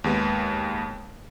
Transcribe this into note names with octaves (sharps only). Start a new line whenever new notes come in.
D#2 G#3 B3